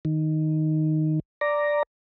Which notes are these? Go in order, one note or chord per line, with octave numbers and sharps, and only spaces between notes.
D#3
D5 A#5